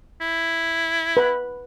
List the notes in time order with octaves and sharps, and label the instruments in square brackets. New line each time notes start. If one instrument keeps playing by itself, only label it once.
[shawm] E4
[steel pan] B4 B5